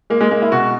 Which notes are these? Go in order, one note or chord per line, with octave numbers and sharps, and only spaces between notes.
G#3 A#3
G#3
G#3 A#3
E4
B2 F#4